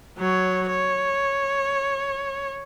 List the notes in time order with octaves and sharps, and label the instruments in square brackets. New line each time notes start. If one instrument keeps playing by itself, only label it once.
[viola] F#3 C#5
C#5